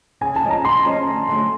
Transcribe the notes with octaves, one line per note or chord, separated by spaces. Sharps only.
C#3 G#5
A5
F3 G#3 C#4
A#5
C#3 C6
F3 G#3 C#4
D2
D3 F#3 A3